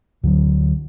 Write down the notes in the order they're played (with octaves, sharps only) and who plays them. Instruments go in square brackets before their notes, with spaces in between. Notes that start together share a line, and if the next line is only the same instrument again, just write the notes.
[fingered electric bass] D2 D3 D#3 F#3